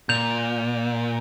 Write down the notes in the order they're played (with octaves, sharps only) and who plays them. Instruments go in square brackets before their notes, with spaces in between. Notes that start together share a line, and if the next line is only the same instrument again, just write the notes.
[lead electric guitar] A#2 [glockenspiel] G6 F7